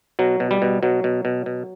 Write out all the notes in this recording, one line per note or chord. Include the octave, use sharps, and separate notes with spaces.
B2 F#3
B2
G3
B2
B2 F#3
B2
B2
B2